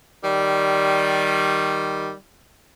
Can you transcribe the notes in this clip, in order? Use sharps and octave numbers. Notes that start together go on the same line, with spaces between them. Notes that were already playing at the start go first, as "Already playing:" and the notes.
D#3 G3